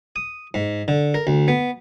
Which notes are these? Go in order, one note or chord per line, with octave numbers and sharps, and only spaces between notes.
D#6
G#2
D3
A#4
D2
B3